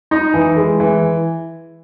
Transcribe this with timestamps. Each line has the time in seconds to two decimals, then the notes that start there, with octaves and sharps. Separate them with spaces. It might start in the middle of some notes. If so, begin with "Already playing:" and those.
0.11 D#4
0.34 E3
0.56 G#3
0.80 E3